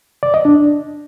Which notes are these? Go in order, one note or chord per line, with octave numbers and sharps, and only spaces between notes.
D5
D#5
D4